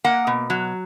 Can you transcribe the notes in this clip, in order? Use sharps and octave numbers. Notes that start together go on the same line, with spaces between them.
A#3 F#5
B2
F#3